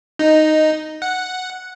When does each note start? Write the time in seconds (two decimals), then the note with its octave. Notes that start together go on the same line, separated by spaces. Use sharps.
0.19 D#4
1.02 F#5